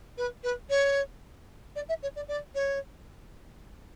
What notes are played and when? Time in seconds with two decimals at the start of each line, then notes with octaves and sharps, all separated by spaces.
0.18 B4
0.44 B4
0.70 C#5
1.76 D5
1.89 E5
2.03 C#5
2.16 D5
2.28 D5
2.55 C#5